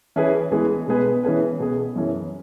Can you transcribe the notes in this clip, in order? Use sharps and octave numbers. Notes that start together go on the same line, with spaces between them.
E3 C#4 E4 G#4 B4
E3 G#3 B3 G#4
B2 G#3 B3 G#4 B4
E3 C#4 G#4 B4
B2 B3 G#4
F#2 E3 C#4